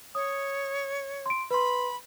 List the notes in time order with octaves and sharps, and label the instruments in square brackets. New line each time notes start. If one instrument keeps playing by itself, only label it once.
[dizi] C#5 [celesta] D#6
[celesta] C6 D7
[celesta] B4 C6 [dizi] B5